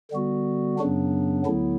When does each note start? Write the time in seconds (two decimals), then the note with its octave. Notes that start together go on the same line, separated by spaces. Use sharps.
0.12 D3 G3 B3 F#4
0.78 F#2 C#3 F#3 B3 D4
1.46 D2 D3 F#3 B3 E4